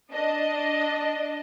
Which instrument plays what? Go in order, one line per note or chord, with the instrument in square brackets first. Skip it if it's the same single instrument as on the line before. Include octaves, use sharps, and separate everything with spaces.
[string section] D4 D#5